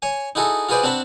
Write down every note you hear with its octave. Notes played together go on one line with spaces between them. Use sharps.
C#5 G#5
D#4 E4 F#4 G#4 A4
F4 F#4 G#4 B4 C5 D5
C4 D4 F#4 A5 B5